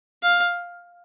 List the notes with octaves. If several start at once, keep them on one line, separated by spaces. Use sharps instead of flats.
F5